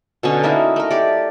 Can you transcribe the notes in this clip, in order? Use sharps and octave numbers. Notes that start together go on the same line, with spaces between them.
B2 D3 C#4
A#3 D#4 E4 F#4
A3 A#4
G4 D5